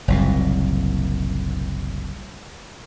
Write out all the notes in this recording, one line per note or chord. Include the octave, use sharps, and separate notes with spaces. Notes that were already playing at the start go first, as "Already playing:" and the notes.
F#1 C2 A#2